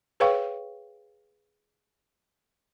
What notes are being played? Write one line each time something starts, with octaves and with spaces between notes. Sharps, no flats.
G#4 B4 C#5 F5 G5 C#6